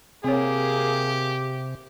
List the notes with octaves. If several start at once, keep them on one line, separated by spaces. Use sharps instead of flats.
C3 A#3 C4 G4 G#4 C#5